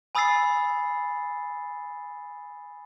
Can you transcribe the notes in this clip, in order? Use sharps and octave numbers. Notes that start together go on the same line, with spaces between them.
G#5 B5 D#6 E6 A6 C7